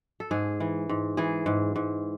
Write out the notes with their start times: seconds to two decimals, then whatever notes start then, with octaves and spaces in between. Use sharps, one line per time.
0.20 A4
0.31 G#2 G#4
0.60 E3
0.89 G#2
1.17 E3 G#4
1.46 G#2
1.76 G#2